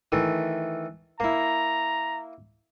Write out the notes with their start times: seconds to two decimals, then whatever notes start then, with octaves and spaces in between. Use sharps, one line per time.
0.12 D#3 E3 A3
1.20 A#3 E4 A#5